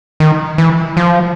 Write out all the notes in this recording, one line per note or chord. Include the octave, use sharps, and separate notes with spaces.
D#3
E3
F3